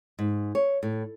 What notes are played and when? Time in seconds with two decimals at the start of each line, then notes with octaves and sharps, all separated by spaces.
0.19 G#2
0.55 C#5
0.83 A2